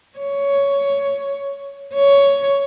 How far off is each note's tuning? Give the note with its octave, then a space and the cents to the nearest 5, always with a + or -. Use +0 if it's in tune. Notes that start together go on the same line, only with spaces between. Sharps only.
C#5 +10
C#5 +10